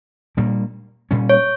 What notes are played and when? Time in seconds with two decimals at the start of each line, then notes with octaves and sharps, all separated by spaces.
0.37 A#2 G3 A#3 D4
1.11 A#2 G3 C#4
1.29 C#5